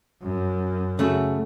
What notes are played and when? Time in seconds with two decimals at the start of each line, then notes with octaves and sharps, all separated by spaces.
0.22 F#2
0.99 C#3 A3 F#4